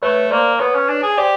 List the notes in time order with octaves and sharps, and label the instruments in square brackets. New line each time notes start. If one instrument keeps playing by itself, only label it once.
[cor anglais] A3 [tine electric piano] B4 C#5
[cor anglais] A#3 [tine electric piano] C5 D5
[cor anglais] B3 [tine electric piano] B4 C#5
[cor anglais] C#4
D4
G#4
[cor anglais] G4 [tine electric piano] C5 D5